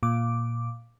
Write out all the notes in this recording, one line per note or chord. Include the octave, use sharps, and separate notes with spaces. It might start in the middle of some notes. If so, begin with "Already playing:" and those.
A#2 D6